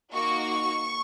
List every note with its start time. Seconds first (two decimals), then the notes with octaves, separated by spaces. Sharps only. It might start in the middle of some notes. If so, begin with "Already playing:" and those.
0.12 A#3 D#4 F#4 C#6